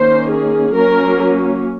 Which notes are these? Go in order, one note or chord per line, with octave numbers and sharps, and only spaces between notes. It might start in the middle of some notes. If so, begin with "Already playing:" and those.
Already playing: D#3 A#3 C#4 C5
G#4
F#3 A#3 C#4 A#4